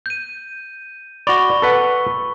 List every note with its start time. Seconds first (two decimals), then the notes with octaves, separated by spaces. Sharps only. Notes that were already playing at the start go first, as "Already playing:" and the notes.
0.06 G6 D#7
1.27 F#4 D5 B5 C#6 G7
1.62 A4 B4 F#5